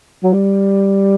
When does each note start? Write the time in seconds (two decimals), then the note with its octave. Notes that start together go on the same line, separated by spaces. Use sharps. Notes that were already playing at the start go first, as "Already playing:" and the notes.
0.24 F#3
0.33 G3